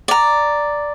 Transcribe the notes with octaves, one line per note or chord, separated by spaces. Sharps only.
D5 A#5